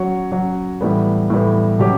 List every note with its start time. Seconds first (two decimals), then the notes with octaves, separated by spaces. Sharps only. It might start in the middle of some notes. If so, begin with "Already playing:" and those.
Already playing: F#3 C#4 F#4 C#5
0.32 F#3 C#4 F#4 C#5
0.81 A2 E3 G3 B3
1.30 A2 E3 G3 B3
1.79 B2 F#3 C#4 G4